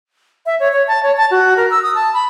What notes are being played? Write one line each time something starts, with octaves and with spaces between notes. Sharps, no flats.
E5
C#5
C#5
A5
C#5
A5
F#4
A#4
E6
D#6
A5
B5